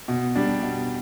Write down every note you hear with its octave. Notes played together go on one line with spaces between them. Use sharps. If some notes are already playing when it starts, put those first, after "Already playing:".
B2
G3 D4
B2